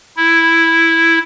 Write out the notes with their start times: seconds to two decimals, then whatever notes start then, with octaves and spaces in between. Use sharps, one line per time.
0.17 E4